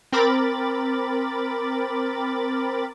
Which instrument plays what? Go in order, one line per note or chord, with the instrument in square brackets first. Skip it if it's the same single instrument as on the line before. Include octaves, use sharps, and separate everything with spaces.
[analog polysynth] C4 A#4 B5 D6 A6